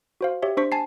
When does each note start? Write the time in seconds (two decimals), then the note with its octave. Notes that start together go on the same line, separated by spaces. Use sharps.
0.21 F#4 C5 F5
0.42 G4 C#5 E5
0.57 D4 C5 C#6 B6
0.72 G#5 A5 C7